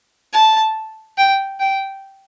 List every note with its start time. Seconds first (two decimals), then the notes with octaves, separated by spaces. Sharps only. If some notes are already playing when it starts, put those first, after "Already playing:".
0.33 A5
1.18 G5
1.60 G5